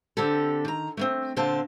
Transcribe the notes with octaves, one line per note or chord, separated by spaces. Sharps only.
D3 C4 G4 A4
D#3 A#5
A3 A#3 C4
A#2 D3 C4 F5 A5